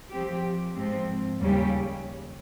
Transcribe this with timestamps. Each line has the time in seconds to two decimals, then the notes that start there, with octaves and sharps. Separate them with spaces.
0.11 F3 C4 G4
0.75 G#2 F3 C4
1.39 D#2 C#3 G3 C#4 G4